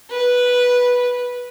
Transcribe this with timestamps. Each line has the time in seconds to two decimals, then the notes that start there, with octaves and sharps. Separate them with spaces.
0.11 B4